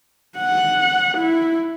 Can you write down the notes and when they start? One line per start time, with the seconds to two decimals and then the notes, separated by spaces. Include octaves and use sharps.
0.38 F#5
1.18 E4